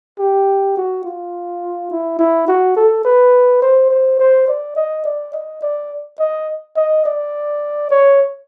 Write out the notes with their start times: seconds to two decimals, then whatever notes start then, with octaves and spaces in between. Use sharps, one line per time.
0.19 G4
0.77 F#4
1.05 F4
1.91 E4
2.19 E4
2.48 F#4
2.76 A4
3.05 B4
3.62 C5
3.90 C5
4.19 C5
4.48 D5
4.76 D#5
5.05 D5
5.33 D#5
5.62 D5
6.19 D#5
6.76 D#5
7.05 D5
7.91 C#5